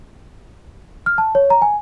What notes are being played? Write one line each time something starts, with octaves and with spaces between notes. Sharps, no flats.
F6
A5
C#5
A#5
G#5